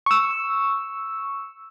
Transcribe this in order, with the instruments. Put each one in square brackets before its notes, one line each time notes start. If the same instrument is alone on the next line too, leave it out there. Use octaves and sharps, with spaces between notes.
[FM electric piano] C#6 E6